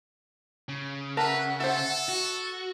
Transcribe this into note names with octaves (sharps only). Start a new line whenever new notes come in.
C#3
A#4 B4 E5 F#5 A5
A4 C5 E5
F#4